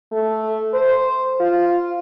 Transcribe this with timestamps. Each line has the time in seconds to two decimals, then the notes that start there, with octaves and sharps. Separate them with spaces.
0.12 A3
0.74 C5
1.40 F4